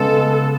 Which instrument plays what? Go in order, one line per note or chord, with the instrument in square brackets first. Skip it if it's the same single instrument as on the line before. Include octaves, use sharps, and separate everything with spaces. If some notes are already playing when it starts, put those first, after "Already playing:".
Already playing: [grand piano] C#3 G#3 B3 [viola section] A4